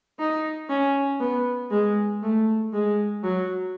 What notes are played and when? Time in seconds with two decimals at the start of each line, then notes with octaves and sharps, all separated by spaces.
0.19 D#4
0.70 C#4
1.20 B3
1.71 G#3
2.23 A3
2.73 G#3
3.24 F#3